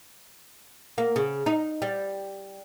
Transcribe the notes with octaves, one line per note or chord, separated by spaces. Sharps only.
A#3
C#3
D#4
G3